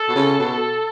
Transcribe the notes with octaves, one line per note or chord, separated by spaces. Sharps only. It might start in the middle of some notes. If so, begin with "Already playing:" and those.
Already playing: A4
B2
C#3
B2